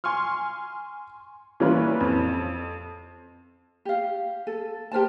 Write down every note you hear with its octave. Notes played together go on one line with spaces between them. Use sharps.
G#5 C6 C#6 F6
E3 G3 A#3 C#4 F4 B4
F2
G4 F5
A4
G4 A#4 C5 A5